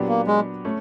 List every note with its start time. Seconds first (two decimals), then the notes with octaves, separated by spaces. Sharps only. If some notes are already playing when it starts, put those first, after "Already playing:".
Already playing: A#2 F#3 B3 D4 G4
0.08 A#3
0.27 G#3
0.65 A3 C#4